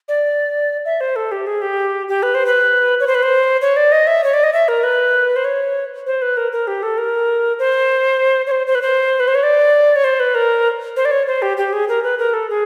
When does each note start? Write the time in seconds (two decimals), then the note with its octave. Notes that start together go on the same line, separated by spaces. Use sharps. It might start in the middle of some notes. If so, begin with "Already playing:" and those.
0.08 D5
0.85 E5
1.00 C5
1.16 A4
1.31 G4
1.47 G#4
1.62 G4
2.08 G4
2.23 B4
2.34 C5
2.46 B4
3.00 C#5
3.07 C5
3.15 B4
3.23 C5
3.61 C#5
3.76 D5
3.92 D#5
4.07 E5
4.24 C#5
4.33 D5
4.43 D#5
4.53 E5
4.68 A#4
4.83 B4
5.36 C5
5.45 C#5
6.06 C5
6.22 B4
6.37 A#4
6.52 A#4
6.67 G4
6.83 A4
6.98 A#4
7.59 C5
8.47 C#5
8.51 C5
8.67 C5
8.75 B4
8.82 C5
9.20 B4
9.28 C5
9.35 C#5
9.43 D5
9.96 C#5
10.04 C5
10.20 B4
10.35 A#4
10.96 C5
11.05 D5
11.11 C#5
11.27 C5
11.42 G4
11.57 G4
11.73 G#4
11.88 A#4
12.03 B4
12.19 A#4
12.33 A4
12.49 G#4